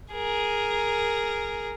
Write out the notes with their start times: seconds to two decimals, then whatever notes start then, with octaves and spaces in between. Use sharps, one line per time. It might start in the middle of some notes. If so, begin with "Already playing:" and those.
0.12 G#4 A#4